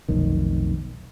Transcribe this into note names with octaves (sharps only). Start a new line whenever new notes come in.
F1 B1 D#3